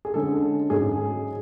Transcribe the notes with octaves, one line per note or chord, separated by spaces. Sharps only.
G#4
D3 G#3 C#4 A4
G#2 F#3 C#4 G#4